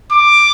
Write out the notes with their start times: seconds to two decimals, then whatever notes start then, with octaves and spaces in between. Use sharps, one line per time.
0.12 D6